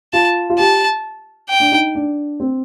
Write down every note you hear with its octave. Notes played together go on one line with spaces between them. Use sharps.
F4 A5
F4
G4 A5
G5
D4
D#4
D4
C4